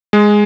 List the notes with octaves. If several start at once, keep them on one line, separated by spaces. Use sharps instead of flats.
G#3